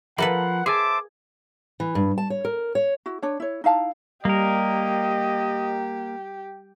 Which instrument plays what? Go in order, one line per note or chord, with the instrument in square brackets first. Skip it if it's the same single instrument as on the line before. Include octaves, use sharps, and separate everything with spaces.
[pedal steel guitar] F3 B5 [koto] A#3 A4 B4 [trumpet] F#5
[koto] G#4 [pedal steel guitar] C5 E5 A5 [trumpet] D6
[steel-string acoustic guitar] E3
G2
A5
C#5
A#4
C#5
[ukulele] E4 F#4
D4 C#5
E4 C#5
D#4 E4 F5 A5
[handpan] G3 [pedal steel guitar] A#3 A#4 [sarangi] G4 [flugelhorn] D#5